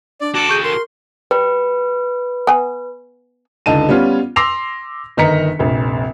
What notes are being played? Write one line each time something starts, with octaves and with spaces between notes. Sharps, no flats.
D4 D5
F#4 A4 A5 D6
G#4 C#6 G6 D#7
A#4 C6
G3 B4
B3 G#5
C#2 D3 D#4 A5 D#7
G3 B3 C#4 F4
C6 D6 E6 A#6 C7 F7
G1 D#3 D#5 A#5 B6 C#7
F1 A#1